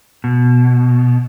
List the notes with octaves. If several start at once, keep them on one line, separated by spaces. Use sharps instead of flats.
B2